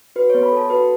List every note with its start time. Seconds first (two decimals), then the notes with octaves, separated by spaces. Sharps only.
0.16 F#4 B4
0.30 C#5
0.34 B3
0.43 B5
0.52 A4 A5
0.70 F#4 B4